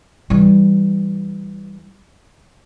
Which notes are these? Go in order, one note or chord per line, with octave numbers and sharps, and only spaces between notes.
E3 G3